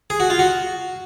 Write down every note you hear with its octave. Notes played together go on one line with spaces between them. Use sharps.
G#4
F#4
F4
F#4